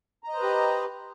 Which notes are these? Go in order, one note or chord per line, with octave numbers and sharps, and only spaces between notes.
G4 B4 C5 D#5 A#5